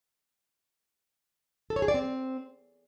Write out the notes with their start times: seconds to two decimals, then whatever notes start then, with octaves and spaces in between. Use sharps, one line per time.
1.70 A4
1.76 C#5
1.82 G#4
1.88 D5
1.94 C4